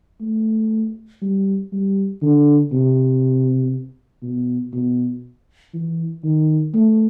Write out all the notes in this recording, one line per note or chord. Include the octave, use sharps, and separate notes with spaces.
A3
G3
G3
D3
C3
B2
B2
E3
D#3
A3